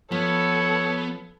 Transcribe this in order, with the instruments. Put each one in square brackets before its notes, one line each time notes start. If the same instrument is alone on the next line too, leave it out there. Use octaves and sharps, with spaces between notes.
[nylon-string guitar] F3 [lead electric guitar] B3 [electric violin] A4 [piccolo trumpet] C#5